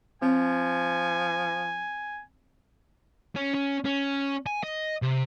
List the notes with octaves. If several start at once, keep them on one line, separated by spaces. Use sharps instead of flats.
F3 C4 G#5
C#4
C#4
C#4
G#5
D#5
C3